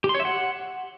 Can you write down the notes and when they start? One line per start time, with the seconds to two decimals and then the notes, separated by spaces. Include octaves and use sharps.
0.04 G4
0.09 C6
0.14 C#5
0.20 E5
0.25 F#5